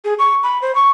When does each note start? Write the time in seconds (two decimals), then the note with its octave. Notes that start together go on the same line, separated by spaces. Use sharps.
0.05 G#4
0.19 C#6
0.43 B5
0.62 C5
0.75 C#6